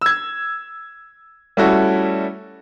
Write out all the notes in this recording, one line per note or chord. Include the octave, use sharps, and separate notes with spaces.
E6 G#6
G3 A3 C#4 E4 F#4 A4